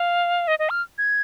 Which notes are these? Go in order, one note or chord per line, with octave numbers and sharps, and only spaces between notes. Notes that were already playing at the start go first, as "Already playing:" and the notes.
Already playing: F5
D#5
D#5
F6
G#6